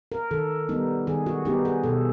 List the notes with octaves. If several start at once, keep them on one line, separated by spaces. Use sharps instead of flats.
A#4
D#3 A4
G3 B3 D#4
D#3 G#4
F#4
G3 B3 D#4 G4
G#4
B2 A4